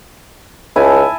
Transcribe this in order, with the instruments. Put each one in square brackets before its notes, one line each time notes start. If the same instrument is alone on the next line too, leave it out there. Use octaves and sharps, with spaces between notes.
[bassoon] C#2 [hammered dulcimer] E4 G#5 A5